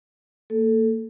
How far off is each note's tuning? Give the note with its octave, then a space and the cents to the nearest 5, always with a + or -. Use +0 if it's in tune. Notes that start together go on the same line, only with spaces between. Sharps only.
A#3 -30 A4 +0